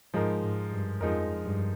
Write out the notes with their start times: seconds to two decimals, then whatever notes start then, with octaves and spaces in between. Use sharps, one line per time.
0.13 G#2 F3 G#3 D#4 A#4
0.43 G#2
0.71 G2
1.01 F2 F3 G#3 D#4 A#4
1.44 G2